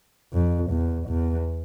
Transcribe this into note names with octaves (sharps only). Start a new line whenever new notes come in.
F2
E2
E2